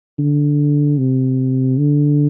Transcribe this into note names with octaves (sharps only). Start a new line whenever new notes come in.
D3
C3
D3